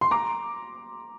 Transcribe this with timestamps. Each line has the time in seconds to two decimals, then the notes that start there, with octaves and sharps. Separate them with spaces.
0.01 C6
0.11 A#5 D6